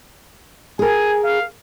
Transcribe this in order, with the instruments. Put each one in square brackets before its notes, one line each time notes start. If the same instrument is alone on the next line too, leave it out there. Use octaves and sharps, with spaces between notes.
[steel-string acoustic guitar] G#4 A#4 [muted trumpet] G#5
[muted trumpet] F5